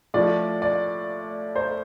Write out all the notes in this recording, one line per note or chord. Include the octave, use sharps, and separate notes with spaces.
A2 F3 D5
D5
C5